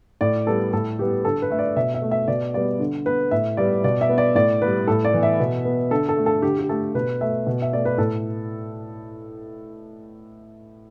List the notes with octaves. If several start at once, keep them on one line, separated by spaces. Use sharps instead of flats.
A2 D5
G3 B3 A4
A2 A4
G3 B3 G4
D3 A4
B4
A3 E5
D5
B2 E5
E5
A3
E5
B2 D5
G3 B3 D5
D3
B3 B4
A2 E5
G3 B3 D5
B2 D5
E5
B3
D5
A2 D5
G3 B3 B4
A2 A4
D5
E3 B3
E5
B2
B3
D3 A4
A4
A3
A4
D3 G4
G4
A3 A4
B2 B4
A3 E5
B2
E5
A3 D5
B4
A2 A4